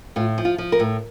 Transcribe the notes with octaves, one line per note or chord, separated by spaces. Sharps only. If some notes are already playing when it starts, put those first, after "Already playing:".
A2 F4
F3
F4
F3
A#4
A2